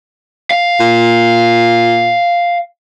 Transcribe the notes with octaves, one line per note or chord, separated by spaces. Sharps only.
F5
A#2